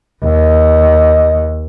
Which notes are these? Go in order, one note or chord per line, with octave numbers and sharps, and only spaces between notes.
D#2 D#5